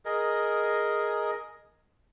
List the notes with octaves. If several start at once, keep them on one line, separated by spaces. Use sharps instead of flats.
G#4 A#4 D#5